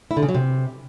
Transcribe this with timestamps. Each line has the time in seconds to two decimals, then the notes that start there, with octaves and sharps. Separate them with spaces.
0.11 E4
0.17 D3
0.23 C#3
0.29 F#3
0.35 C3